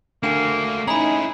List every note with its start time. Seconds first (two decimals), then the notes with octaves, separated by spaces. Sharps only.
0.23 A3 A#3 D4 F#4 G5 G#5
0.88 C#4 D#4 E4 G#4 A#5 B5